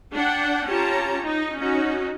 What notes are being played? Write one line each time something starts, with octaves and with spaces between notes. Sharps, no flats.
D4 F#5 G5
C#4 F4 G4 C#5 A5 A#5
D#4
C#4 D#4 F#4